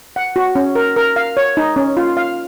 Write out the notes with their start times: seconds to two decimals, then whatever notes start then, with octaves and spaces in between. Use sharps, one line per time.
0.16 F#5
0.36 F#4
0.55 C#4
0.75 A#4
0.96 A#4
1.16 F5
1.37 C#5
1.57 D#4
1.76 C#4
1.97 F4
2.17 F5